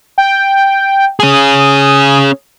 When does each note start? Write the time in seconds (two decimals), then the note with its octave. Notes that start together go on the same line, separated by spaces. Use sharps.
0.18 G5
1.20 C#4 G#4 D#6